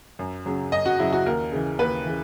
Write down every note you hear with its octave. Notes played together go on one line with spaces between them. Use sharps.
F#2
C#3 F#3
F#2 D#5
F#4
C#3 F#3 E4
F#4
D#2 A#4
C#3 E3
D#2 B4
C#3 E3